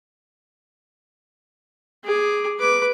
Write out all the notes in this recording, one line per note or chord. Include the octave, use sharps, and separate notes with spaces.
G#4 D6
B4 D6